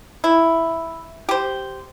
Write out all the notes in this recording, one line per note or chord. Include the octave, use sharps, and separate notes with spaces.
E4
G4 C5